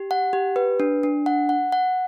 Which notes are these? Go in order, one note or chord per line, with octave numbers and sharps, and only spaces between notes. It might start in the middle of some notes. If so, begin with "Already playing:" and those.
Already playing: G4
F#5
G4
B4
D4
D4
F#5
F#5
F#5